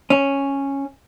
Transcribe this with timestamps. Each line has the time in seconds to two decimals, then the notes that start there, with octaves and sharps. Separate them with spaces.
0.10 C#4